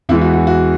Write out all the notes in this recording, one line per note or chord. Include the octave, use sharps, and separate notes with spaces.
E2 E3 G#3 E4
F#4
F#4
F#4